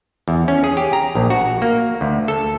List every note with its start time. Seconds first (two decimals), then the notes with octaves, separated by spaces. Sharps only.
0.28 E2
0.48 C#4
0.64 G#4
0.77 G4
0.93 A#5
1.15 A#1
1.30 F#4
1.62 A#3
2.01 D2
2.28 A4